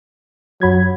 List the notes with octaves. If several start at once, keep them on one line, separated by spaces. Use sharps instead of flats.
F#2 F#3 B5 G#6